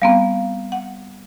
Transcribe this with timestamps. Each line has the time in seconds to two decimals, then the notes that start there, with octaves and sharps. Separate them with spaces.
0.02 G3 B3 C4 F5 A#5
0.72 F#5